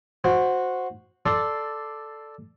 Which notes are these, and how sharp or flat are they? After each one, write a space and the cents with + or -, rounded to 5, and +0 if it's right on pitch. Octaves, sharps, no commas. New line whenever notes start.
F#4 -10 C5 +0
A4 +0 D5 +5 C6 +0